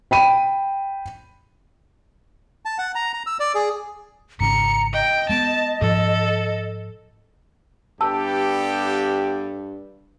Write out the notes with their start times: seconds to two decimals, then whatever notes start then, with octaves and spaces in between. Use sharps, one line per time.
0.11 G5 B5 D#7
2.65 A5
2.78 F#5
2.95 A#5
3.14 A#5
3.27 E6
3.40 D5
3.55 G#4
4.40 G#1 G#2 C#3 A#5 C#7
4.94 D#5 G5
5.29 G#3 B3 A5
5.82 G#2 F3 A4
8.01 G2 B3 G4 A4 A5 E6